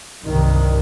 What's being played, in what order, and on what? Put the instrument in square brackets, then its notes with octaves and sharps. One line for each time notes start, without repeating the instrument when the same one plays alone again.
[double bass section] C2 G2 D#3